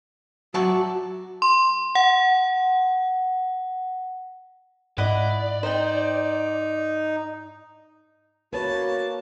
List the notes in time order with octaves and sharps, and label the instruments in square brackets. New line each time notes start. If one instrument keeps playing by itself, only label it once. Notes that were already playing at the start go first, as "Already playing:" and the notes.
[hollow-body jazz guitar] F#3 E5 F#5 [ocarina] F#4 [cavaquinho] D5 A5 C#6
[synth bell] C6
F#5
[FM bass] G#2 [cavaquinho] E4 D#5 F#5 [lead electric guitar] D5
[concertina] D#4 [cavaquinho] C5 G5
[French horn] A#3 [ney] F#4 [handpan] B4 C#5 [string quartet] A5